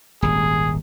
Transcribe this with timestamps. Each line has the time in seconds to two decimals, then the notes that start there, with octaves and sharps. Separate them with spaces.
0.22 D#1 G#1 G#4